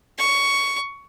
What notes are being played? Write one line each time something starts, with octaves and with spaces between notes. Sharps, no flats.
C#6